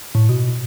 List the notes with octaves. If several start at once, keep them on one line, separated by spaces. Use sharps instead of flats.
A2
B2